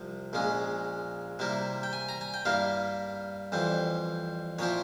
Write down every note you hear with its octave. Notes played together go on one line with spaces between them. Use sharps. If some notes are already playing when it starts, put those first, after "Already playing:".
Already playing: C2 C3 F3
A#1 A#2 G#3 C#4
C3 G3 A#3 E4
G5
G#5
A#5
G#5
G5
G2 G3 A#3 E4 F5
F2 E3 G3 C4
A#2 F3 C4 E4 C#5